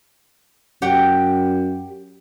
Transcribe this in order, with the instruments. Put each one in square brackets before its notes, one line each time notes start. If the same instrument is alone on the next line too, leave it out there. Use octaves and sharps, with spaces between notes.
[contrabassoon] F#2 [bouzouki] G4 F#5 G5